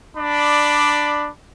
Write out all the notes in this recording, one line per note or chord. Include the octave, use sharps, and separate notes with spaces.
D4 D5 B5